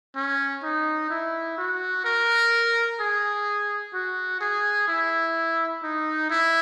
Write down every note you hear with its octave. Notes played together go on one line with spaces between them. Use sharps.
C#4
D#4
E4
F#4
A#4
G#4
F#4
G#4
E4
D#4
E4